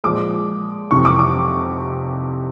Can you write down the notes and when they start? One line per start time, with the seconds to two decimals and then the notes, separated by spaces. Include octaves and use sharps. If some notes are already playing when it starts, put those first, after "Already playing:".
0.04 A#2 F3 G#3 D6
0.91 F2 C3 E3 C#6
1.05 D6
1.19 D6